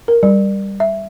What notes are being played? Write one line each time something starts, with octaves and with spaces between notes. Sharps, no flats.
A#4
G3
E5